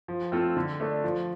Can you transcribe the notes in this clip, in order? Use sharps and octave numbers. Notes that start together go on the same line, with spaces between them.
F3
A3 C4 F4 A4
D3
A3 D4 A4
F3